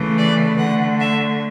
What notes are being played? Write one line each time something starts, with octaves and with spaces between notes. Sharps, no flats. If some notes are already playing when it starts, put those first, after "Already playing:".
Already playing: C#3 E3 A3
D5
D3 A3 F#5
E5